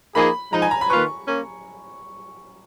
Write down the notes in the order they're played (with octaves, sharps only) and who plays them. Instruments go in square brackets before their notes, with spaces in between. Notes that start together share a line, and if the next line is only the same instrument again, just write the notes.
[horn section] F3 A#3 D#4 G#4 [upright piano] B5
[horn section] F3 G#3 D#4 [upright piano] A#5
[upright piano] G#5
A#5
B5
[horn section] D#3 A#3 F4 B4 [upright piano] C#6
[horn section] A#3 C#4